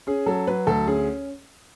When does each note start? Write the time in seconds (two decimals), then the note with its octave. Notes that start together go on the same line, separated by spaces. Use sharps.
0.07 C#4 G#4
0.26 F#3 A4
0.47 F#3 B4
0.67 D2 A4
0.87 C#4 G#4